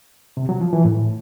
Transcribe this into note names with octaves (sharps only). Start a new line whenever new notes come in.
C3
F#3
F3
E3
A2